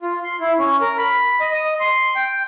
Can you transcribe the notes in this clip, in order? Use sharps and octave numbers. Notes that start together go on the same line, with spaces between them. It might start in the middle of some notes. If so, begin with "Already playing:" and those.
F4
C6
E4
C#4
A#4
B5
D#5
D#5
C6
G5